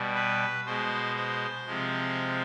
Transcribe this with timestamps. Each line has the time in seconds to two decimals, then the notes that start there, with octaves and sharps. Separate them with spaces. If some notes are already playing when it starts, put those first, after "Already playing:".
Already playing: B2 G3
0.15 B4
0.65 B2 G#3 C5
1.16 C5
1.67 C3 F3 G#3